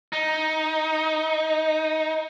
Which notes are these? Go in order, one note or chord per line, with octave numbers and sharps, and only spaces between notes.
D#4